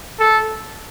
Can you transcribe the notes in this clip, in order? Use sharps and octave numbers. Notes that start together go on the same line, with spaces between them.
A4